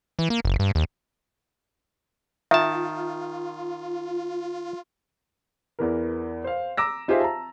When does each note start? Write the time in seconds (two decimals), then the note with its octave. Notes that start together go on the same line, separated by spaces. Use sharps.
0.19 E3
0.30 A#3
0.45 F#1
0.59 G2
0.75 D#2
2.51 D#3 F4 E5 A5
5.79 E2 E3 A#4
6.44 C5 F5
6.77 A#5 D6 E6 A#6
7.08 D#4 F4 G4 G#4 C5 E5
7.20 A5 A#5